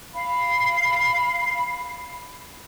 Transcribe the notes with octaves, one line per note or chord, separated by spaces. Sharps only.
F5 B5